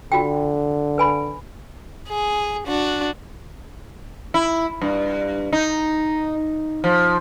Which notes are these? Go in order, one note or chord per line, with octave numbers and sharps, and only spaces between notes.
D3 F4 F#4 G5
B4 G#5 B5
G#4
D4 F#4
E4
G2
D#4
F3